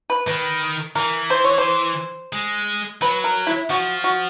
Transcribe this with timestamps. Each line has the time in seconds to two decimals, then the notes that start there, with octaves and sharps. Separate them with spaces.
0.10 B4
0.27 D#3 B4
0.96 E3 A#4
1.30 C5
1.44 C#5
1.58 C5
2.33 G#3
3.01 F#3 B4
3.24 A#4
3.47 E4
3.70 F3 F#4
4.04 F#4